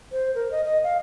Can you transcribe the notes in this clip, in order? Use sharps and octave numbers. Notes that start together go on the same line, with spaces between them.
C5
A#4
D#5
D#5
F5